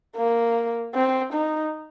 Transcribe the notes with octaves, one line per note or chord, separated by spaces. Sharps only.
A#3
C4
D#4